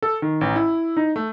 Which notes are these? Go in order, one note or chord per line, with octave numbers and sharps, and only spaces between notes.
A4
D#3
A1
E4
D#4
A3